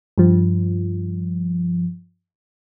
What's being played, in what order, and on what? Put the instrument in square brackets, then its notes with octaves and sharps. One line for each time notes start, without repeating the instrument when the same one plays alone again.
[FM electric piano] G2 F3